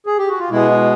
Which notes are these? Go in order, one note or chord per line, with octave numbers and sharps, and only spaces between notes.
G#4
G4
F#4
F4
B2 G#3 B3 E4